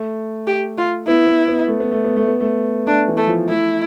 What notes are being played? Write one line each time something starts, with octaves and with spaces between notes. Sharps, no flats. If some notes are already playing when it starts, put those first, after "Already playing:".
Already playing: A3
G4
F4
B3 E4
B3
B3
A3
B3
A3
B3
A3
B3
A3
A3 D4
E3
A3
F3
A3 E4